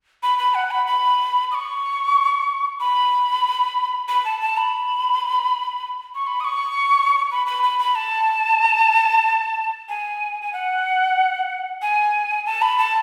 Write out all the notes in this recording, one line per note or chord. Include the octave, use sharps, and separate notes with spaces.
B5
B5
F#5
B5
B5
D#6
C#6
B5
B5
A5
A5
B5
C#6
B5
D#6
C#6
B5
B5
B5
B5
A5
G#5
G#5
F#5
G#5
A5
B5
A5